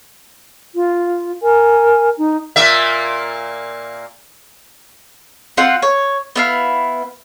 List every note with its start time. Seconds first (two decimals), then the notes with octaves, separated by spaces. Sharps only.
0.75 F4
1.43 A#4 G#5
2.18 D#4
2.56 A#2 A#3 E5
5.57 C4 F4 F#5
5.82 C#5
6.36 B3 E4 F5